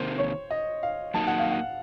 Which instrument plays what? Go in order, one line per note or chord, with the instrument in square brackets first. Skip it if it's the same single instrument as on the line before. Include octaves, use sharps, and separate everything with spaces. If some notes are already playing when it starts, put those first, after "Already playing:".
Already playing: [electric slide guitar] C3 D#3 A#3 [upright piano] C5
[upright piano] C#5
D#5
F5
[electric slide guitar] F#3 A#3 D#4 F#4 [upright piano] A5
[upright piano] F#5
F5
F#5